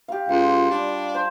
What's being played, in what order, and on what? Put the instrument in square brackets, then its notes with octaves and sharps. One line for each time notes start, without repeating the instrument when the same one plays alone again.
[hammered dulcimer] G4 F5
[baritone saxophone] C#2 [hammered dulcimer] F4
[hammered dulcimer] G3 [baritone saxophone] D4
[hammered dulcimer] C5